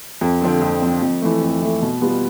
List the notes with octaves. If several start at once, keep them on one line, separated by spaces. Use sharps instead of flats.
F2
D3 F3 C4
F2
D3 F3 C4
F2
E3 A3
F2
E3 A3
B2
G3 B3 F4